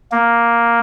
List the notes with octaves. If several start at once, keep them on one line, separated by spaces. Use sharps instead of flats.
A#3